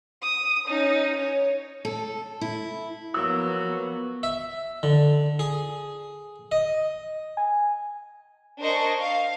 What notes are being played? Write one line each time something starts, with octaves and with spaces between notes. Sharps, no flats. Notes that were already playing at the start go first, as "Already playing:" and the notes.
D#6
C#4 D#4
C#5
A4
E4
F3 F#3 A#3 B3 F#4 E6
E5
D3
G#4
D#5
G#5
D4 A#4 C5 D#5 G#5 C#6
F5